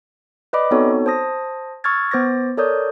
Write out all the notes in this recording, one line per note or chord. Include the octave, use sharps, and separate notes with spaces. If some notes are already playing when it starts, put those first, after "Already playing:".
B4 D5 D#5 B5 D6
B3 C4 D#4 F#4 A4 C#5
C5 A5 D#6 A#6
C#6 E6 F6 G#6 A6
B3 C5 D6 A6 A#6
A4 A#4 C#5 D5 D#6 G6